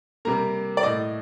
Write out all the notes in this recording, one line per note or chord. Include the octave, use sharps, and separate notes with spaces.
C3 G3 A#3 A#5
D5
A2 A3 D#5